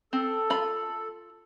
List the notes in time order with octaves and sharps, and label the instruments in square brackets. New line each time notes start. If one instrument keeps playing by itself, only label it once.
[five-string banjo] C4 [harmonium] A4
[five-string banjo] F4 B5